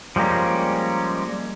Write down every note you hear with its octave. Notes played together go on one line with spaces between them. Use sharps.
F3 G3 G#3 A#3 C#4